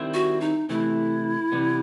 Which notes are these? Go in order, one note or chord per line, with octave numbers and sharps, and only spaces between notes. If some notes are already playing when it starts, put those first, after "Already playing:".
Already playing: D#3 G3 C4 E4
F#4
D#4
C3 E3 A3 E4
C3 E3 G3 B3